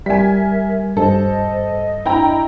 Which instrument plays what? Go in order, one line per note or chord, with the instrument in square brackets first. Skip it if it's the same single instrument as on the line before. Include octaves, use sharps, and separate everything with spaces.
[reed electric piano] G3 [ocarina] A#4 [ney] E5 [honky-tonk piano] G#5 B6
[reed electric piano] G2 [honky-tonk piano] A4 [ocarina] C5 [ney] D#5
[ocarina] D4 [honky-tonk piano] E4 G5 A#5